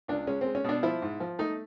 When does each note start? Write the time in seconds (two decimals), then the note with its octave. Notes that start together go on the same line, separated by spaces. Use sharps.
0.08 C#2 D4
0.27 G#3 C#4
0.41 C4
0.46 G#3
0.55 C#4
0.64 B2 D4
0.83 F3 E4
1.02 G#2
1.20 F3
1.39 A3 D#4